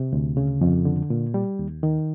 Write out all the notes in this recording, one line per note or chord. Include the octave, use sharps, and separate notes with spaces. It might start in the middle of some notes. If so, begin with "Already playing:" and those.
Already playing: C3
D2
C#3
F2
D3
A#2
G3
D#2
D#3